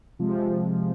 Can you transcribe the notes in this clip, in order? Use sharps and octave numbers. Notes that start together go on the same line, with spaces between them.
C3 F3 G#3